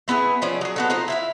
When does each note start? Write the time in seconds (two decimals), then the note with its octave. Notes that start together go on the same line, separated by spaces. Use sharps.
0.08 A3 B3 E4 G#4
0.42 F3 C#4 D5
0.61 F#3 G#4
0.76 B3 F#4 A4
0.90 D#4 F4 C5 A#5
1.08 E4 E5 F5